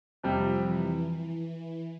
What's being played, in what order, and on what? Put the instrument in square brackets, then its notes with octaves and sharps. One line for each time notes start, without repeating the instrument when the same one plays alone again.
[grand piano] F2 C3 G3 [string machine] F3
[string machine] E3
E3